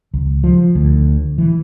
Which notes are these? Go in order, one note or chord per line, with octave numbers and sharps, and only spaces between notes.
C#2
F3
D2
E3